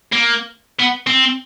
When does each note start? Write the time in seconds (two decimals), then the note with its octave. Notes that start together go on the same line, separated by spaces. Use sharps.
0.13 A#3
0.79 B3
1.07 C4